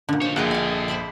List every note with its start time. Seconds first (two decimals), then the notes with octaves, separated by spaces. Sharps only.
0.09 A#2 D3
0.21 D#4 C5 C#5
0.36 A#1 A#3 G#4 A4 D#5 F#5 G5
0.51 F5 G#5
0.88 C5 B5 D6